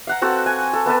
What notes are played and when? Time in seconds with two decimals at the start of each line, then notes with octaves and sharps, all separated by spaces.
0.07 F5 F#5 A#5
0.22 C4 F#4 A4
0.46 G#5
0.73 A4
0.86 B3 A4 B4 A5